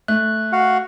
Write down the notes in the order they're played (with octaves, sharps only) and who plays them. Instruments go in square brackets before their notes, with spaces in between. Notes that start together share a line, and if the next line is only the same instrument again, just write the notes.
[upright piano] A3 [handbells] F#6
[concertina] F#4 F5 F#5